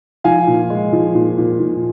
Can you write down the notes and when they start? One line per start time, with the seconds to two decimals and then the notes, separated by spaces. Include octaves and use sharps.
0.24 F3 F5 G#5
0.47 A#2
0.70 G#3
0.93 F3
1.15 A#2
1.38 A#2
1.60 A#2